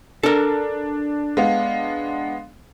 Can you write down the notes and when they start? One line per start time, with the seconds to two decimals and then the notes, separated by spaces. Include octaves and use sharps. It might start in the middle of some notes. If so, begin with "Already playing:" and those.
0.23 D4 A4 A#4
1.37 G#3 B3 F5